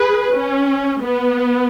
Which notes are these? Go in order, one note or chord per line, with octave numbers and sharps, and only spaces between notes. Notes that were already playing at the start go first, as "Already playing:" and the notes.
Already playing: G#4 B4
C#4
B3